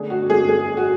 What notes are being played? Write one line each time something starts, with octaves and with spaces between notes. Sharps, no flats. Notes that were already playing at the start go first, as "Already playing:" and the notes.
Already playing: D3 A3 D4 G#4
F#4
G#4
G#4
F#4